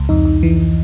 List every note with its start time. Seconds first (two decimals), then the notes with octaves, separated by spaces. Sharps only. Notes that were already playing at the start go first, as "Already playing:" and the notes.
Already playing: C#2
0.09 F2 D#4
0.25 F2
0.43 E3